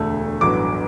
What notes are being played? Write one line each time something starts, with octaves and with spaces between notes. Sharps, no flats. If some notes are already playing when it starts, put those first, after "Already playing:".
Already playing: E1 D2 D3 A3
A1 G2 F#3 B3 D6